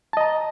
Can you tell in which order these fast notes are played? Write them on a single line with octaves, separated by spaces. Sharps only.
A5 D#5 A#5